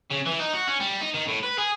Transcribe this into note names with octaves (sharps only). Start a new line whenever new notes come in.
C#3
E3
D#4
F#4
C#4
G3
D#4
D#3
A2
B4
G#4